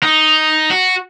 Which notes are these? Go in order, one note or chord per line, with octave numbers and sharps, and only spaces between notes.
D#4
F#4